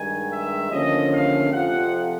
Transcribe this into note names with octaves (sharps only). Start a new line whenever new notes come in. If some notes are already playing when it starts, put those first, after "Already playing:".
Already playing: G2 D#3 G#3 G#5
E5
D#2 D3 F3 A3 C#4 D#5
F5
F2 C3 F3 F#5